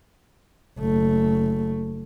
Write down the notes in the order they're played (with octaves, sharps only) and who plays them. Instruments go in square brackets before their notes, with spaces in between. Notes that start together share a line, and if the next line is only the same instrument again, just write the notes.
[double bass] F#1 A3